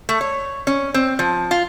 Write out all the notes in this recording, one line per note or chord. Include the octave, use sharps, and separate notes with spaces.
A3
C#5
C#4
C4
F3
F4